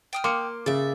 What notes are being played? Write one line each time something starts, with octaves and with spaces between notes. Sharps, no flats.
G5 D#6 F6
A#3 C6 D6 C#7
C#3 D5 E5